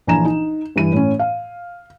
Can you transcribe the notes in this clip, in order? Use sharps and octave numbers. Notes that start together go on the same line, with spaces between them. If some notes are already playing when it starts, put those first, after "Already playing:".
A#1 E3 D4 G#5 A#5 E7
D#4
G2 E3 D#7
A2 C#4
F5